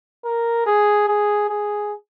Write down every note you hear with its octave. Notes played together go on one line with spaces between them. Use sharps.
A#4
G#4
G#4
G#4